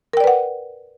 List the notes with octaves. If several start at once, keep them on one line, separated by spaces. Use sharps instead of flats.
A#4 B4 D5 F#5 G5